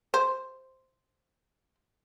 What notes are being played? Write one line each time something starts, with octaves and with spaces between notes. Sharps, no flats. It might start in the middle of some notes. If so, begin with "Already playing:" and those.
C5